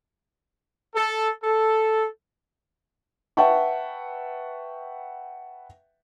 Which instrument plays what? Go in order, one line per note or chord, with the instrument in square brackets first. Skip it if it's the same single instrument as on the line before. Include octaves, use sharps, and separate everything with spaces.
[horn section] A4
A4
[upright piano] B4 E5 F#5 G5 A5 C#6